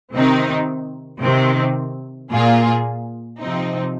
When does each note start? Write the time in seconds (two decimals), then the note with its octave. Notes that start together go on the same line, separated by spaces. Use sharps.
0.13 C3 D#3 C4 D#4
1.21 C3 D#3 C4
2.30 A#2 A#3 F4 G#4
3.40 C3 F3 C4 D#4